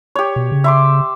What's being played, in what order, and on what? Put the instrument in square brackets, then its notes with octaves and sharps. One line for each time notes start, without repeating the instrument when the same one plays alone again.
[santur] G4 C#5
[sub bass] B2
C#3
[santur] E5 C6 D6